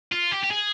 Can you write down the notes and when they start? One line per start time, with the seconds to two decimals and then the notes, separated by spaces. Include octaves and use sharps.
0.12 F4
0.31 G4
0.43 G4
0.51 G#4